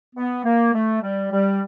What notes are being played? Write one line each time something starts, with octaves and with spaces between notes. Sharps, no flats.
B3
A#3
A3
G3
G3